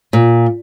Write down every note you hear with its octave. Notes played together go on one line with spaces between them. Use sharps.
A#2